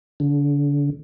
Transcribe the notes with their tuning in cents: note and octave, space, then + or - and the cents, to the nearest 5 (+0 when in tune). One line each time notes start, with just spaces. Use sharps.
D3 -35